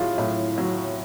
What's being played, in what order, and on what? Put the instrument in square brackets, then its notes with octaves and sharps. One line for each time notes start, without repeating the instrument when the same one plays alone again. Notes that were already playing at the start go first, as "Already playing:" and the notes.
Already playing: [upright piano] A2 F#3 F4 G#4
A2
F#3